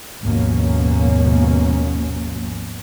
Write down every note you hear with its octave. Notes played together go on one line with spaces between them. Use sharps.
G#1 D#2 B2 F3 A#3 C#4